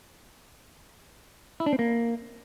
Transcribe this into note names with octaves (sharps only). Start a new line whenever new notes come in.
E4
D4
C4
A#3